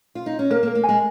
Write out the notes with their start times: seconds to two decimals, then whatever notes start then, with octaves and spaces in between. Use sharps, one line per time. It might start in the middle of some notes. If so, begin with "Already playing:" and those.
0.15 F4
0.26 D#4
0.39 C#4
0.50 A#3 A#4
0.63 A#3
0.67 A#4
0.75 A#3
0.83 G#5
0.89 G#3